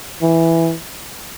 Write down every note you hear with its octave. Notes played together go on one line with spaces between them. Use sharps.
E3